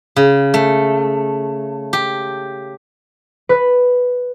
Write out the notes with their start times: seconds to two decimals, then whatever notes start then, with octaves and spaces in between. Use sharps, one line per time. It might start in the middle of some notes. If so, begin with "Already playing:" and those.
0.16 C#3
0.54 A3
1.93 G4
3.49 B4